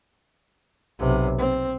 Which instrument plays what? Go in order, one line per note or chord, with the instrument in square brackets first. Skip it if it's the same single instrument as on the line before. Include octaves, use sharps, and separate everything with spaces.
[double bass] B1 C3
C4